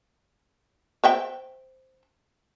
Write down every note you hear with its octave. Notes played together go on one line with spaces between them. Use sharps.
C5 E5 G5